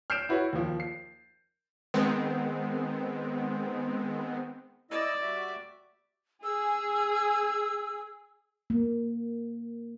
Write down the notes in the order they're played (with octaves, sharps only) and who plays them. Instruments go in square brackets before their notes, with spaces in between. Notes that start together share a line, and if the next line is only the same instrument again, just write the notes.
[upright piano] F6 G6 C7 D7 E7
E4 F#4 B4 C#5
D#2 F3
C7
[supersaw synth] D#3 G#3 B3 C4
[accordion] E4 D#5 E6 [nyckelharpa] D5
[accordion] G3 F#4 E5
[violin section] G#4 [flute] E6
[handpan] A#3